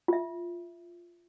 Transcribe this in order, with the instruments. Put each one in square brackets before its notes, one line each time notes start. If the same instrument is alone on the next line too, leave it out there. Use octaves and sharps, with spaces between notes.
[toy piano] F4 E5